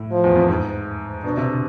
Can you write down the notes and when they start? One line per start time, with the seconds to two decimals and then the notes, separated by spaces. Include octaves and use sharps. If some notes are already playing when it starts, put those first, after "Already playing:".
Already playing: A2
0.11 F3
0.24 E2
0.36 F2
0.49 G#2
1.24 B2 D4
1.37 C3
1.49 D3